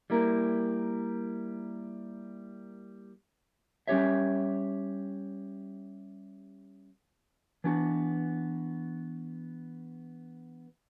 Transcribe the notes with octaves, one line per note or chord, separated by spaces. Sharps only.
G3 A#3 E4 A#4
G3 C#4 G4 C#5 E5
E3 B3 D4 F#4